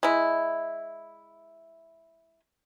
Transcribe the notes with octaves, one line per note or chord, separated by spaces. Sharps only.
G#3 E4